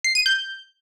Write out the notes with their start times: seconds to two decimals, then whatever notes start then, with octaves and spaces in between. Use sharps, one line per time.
0.04 C7
0.15 D#7
0.26 G6